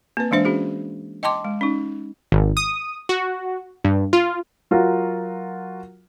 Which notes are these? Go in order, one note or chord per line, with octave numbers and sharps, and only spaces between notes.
A#3 C4 B4
E3 G#3 D4 C5 E5
C#4 F#4 G#4
D#5 G5 A5 C6 D6
G#3
C#4 D#4
G#1
D#6
F#4
G2
F4
F#3 F4 F#4 A#4